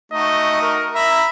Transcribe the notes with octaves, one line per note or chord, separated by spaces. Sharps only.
A3 D#4 F#4 D#5
A#4
E5 A#5 B5